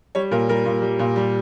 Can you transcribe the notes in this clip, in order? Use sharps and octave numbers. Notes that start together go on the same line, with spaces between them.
G3 C#5
A#2 A#4
G3 A#4
A#2
G3
A#2
G3